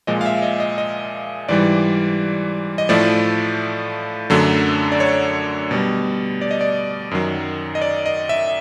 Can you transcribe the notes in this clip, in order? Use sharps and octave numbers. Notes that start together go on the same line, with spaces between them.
A#2 F3 G#3 D#5
F5
E5
D#5
D#5
D#5
G#2 E3 G3 D5
D#5
A2 F3 A3 D5
F#2 D3 F#3 A3
D5
C#5
B2 G3
D5
D#5
D5
F#2 D#3 F#3
D#5
D5
D#5
E5